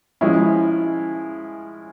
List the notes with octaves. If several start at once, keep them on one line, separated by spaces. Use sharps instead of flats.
F3 G#3 C#4 E4